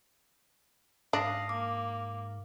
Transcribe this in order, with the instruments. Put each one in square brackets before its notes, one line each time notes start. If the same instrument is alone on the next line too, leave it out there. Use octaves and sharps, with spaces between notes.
[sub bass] G#2 [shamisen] D4 [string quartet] F5 [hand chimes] D#6 A#6 C7
[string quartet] A#3 [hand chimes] D6